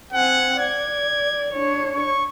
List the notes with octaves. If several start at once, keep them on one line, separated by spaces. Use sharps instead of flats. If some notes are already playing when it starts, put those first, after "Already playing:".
C4 F#5 G#5
D5 G#6
D4 C#5
C#6